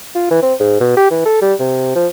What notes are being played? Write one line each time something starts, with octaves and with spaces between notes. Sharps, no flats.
F4
E3
C4
G#2
B2
G4
E3
A4
G3
C3
F3